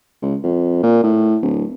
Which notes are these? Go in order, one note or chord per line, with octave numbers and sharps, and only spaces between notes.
C#2
F2
A#2
A2
D1